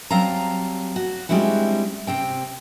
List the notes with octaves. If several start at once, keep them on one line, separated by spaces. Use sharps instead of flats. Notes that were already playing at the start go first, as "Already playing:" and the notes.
F#3 G3 C4 F5 A5 A#5
F#4
G3 G#3 C4 D4 E4 F#4
C3 C4 G5